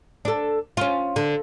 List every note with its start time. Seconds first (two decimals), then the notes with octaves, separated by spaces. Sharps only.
0.25 D4 A4
0.77 C#4 F4
1.16 D3